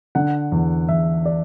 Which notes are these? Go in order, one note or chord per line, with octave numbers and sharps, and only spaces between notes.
D3 F#5
E2
E2 E5
D5